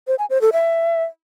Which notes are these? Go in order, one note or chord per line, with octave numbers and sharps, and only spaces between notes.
C5
G#5
C5
A4
E5